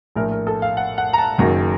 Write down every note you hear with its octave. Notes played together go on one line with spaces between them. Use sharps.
A#1 A2 A3 A#4
A#4
A4
F5
F#5
F#5
A#5
A5
F#1 F#2 D#3 F#3 A#3